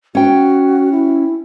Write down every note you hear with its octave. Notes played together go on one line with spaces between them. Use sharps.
C#4 F#4 G5
E4